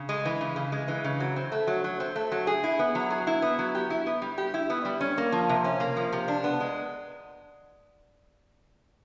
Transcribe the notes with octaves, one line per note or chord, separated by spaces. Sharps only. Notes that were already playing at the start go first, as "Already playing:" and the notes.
Already playing: C#3
G#3
E3
C#3
C#3
G#3
E3
C#3
F#3
C4
A3
F#3
F#3
C4
A3
F#3
G#4
E4
B3
F#3
G#4
E4
B3
F#3
G4
E4
B3
G3
G4
E4
B3
G3
C#4
A#3
F3
C3
C#4
A#3
F3
C3
D4
B3
G#3